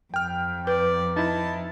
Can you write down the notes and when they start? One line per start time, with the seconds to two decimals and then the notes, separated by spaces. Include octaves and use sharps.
0.14 F2 G5 F6
0.67 B4 D5
1.16 D#4 E4 A5